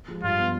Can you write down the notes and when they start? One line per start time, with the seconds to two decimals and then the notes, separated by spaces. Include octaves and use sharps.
0.08 F3 G#3
0.23 G2 F4
0.38 F3 B3